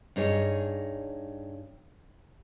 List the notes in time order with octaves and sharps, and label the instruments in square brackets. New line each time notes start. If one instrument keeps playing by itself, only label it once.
[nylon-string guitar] G2 D#4 G#4 C#5